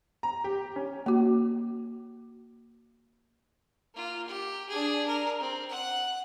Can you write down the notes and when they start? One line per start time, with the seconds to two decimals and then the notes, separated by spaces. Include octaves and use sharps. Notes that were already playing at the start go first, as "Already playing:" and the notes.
0.23 A#5
0.44 G4
0.76 C#4
1.06 A#3 F#4
3.95 A#3 F4
4.28 G4
4.69 D4 G#4
5.07 A#4
5.40 C4
5.69 F#5 F#6